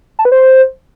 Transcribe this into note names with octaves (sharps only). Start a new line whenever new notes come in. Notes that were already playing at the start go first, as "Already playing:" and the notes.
A5
B4
C5